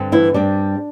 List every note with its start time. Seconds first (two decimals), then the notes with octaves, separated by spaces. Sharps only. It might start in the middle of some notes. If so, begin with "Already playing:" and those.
Already playing: G2 D3 C4
0.12 E3 E4
0.34 G2 G3 C4 D4